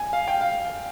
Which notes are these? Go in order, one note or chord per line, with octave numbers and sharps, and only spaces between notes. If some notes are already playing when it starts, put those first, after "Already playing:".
Already playing: G#5
F5
G5
F5